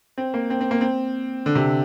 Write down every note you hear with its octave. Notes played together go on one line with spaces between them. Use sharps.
C4
A#3
C4
C4
A#3
C4
D3
C3